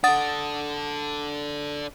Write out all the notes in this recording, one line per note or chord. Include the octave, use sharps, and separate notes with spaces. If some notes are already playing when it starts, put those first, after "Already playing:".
D4 A4 F#5 D#6 A6